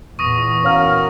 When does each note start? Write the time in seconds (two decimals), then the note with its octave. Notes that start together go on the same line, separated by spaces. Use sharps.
0.19 E2 A#2 C#6 D#6 A#6 D#7
0.64 C#4 F#4 A#4 C#5 F5 F6